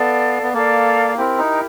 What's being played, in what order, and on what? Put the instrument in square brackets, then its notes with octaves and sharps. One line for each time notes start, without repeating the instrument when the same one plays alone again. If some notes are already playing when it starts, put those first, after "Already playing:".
Already playing: [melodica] B3 [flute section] A4 D5 F5
[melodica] B3
[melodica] A#3 [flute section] A4 D5 F5
[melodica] C4 [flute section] E4 G4 A#4
[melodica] D#4